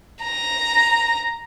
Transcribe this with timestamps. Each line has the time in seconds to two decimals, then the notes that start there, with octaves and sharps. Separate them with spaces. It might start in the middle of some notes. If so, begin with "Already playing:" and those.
0.23 A#5